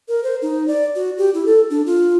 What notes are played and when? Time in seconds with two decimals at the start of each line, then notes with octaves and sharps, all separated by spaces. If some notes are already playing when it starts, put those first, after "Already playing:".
0.08 A#4
0.24 C5
0.42 D#4
0.68 D5
0.96 F#4
1.18 G4
1.34 E4
1.46 A4
1.70 D4
1.86 F4